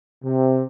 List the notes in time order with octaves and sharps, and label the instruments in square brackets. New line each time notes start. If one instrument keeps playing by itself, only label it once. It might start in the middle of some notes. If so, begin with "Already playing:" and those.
[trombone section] C3